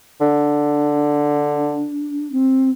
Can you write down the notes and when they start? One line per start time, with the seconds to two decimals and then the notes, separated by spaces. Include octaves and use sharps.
0.21 D3 D4
2.32 C4